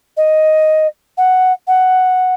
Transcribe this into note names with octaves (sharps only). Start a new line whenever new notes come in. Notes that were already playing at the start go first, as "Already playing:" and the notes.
D#5
F#5
F#5